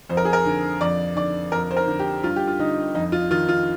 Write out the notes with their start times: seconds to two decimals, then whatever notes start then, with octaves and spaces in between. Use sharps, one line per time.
0.10 F2 C5
0.17 A#4
0.25 G#4
0.33 A#4
0.45 D3
0.81 F2 D5
1.16 D3 D5
1.52 F2 A#4
1.71 C5
1.77 A#4
1.88 D3
1.99 G4
2.24 G2 F4
2.36 G4
2.48 F4
2.59 D3 D#4
2.95 F2 D#4
3.12 F4
3.30 D#3 F4
3.49 F4